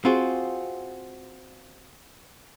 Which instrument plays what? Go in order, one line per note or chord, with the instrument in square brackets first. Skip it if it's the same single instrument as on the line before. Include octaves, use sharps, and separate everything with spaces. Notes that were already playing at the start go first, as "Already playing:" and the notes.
[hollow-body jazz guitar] C4 F4 F#4 G#4